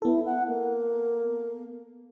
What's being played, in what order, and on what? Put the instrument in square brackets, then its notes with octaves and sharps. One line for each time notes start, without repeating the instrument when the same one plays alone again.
[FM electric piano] B3 A4 [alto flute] E4
[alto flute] F#5
A#3